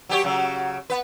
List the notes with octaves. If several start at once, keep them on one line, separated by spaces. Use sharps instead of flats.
F#3 G4 C#5
C#3 F#3
B3 B4